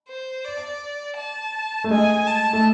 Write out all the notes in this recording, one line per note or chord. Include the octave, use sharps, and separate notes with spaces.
C5
D5
A5
A3
G#3 G#5
A5
A3